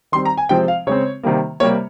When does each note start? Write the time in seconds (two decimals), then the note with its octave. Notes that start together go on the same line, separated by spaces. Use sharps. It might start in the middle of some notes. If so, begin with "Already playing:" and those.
0.12 D#3 G3 C4 C6
0.25 A#5
0.38 G#5
0.49 C3 F3 G#3 C4 G5
0.68 F5
0.87 C#3 G#3 C4 C#5
1.23 C3 D#3 G3 A#3
1.60 C3 G3 A#3 C#5